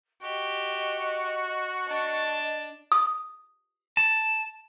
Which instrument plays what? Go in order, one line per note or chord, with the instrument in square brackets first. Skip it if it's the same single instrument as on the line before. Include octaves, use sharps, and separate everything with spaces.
[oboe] F#4 [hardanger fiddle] G4 [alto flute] D#5
[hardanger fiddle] D4 A5 [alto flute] D#5
[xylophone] D#6
[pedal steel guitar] A5